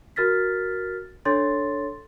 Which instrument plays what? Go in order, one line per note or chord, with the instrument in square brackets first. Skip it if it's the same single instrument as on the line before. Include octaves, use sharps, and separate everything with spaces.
[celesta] F#4 A#4 F6 A6 B6
D4 A4 C#5 C6 A6